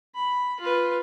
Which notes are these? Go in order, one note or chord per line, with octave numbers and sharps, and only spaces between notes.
B5
F4 B4